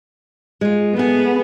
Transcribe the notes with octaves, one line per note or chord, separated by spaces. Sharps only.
G#3 F4
A3 B3 G#4